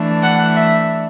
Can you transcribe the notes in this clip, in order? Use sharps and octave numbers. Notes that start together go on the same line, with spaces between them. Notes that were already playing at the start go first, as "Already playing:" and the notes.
Already playing: E3 A3 D4
F#5
E5